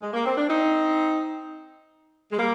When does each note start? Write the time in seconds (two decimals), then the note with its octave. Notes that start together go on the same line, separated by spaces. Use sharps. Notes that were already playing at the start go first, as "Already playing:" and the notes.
0.02 G#3
0.14 A#3
0.26 C4
0.38 D4
0.50 C4 D#4
2.32 G#3
2.38 G3 A#3